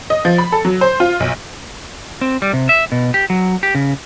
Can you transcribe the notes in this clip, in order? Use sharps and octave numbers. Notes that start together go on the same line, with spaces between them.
D#5
F3
B5
A4
F#3
C5
F4
B1
C4
G3
C3
E5
B2
G4
F#3
G4
C#3